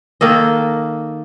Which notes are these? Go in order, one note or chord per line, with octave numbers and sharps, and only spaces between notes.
D#3 A#3 A4 D#5